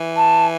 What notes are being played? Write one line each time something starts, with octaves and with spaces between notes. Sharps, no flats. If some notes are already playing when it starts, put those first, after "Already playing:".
Already playing: E3
A5